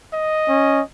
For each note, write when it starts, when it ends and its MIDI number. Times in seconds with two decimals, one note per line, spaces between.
0.14 0.82 75
0.48 0.81 61